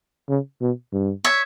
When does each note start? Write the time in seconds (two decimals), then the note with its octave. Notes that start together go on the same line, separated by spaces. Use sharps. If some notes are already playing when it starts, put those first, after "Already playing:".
0.29 C#3
0.61 B2
0.92 G2
1.24 C#5 E5